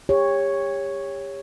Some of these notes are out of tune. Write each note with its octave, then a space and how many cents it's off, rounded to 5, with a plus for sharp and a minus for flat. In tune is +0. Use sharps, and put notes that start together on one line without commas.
G4 +35 C#5 +0